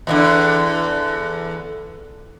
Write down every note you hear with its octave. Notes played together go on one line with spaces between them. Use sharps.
E2 B2 D3